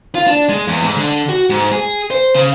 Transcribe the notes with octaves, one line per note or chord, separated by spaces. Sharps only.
F4
D4
G#3
E2
G#2
D3
F#4
G#2
G#4
C5
C#3